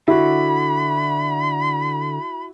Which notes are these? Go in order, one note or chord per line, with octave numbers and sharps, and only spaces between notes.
D3 E4 F#4 B5